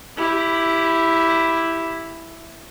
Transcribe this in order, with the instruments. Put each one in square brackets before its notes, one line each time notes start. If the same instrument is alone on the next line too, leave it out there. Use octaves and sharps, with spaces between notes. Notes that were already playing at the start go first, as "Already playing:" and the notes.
[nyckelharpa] E4 G4